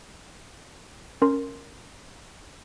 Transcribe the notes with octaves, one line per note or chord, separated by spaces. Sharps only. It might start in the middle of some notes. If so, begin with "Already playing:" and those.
C#4 A#4 C6